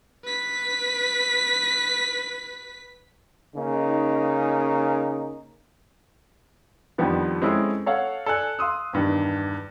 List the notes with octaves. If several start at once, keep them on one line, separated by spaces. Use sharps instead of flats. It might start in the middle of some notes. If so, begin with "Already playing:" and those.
B4 B6
C#3 A#3 D#4
F2 D#3 F3 G3 B3 D4
G#3 C4 C#4 E4 G#4 A4
A4 C#5 F5 F#5
A4 D5 G#5 F#6
F5 C6 D#6 E6
E2 G2 D#3